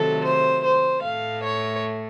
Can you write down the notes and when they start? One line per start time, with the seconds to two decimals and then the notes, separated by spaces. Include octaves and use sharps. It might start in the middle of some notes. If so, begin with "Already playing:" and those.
Already playing: C3 D#3 F#3 A3 A4
0.25 C5
0.64 C5
1.04 A2 A3 F5
1.44 C#5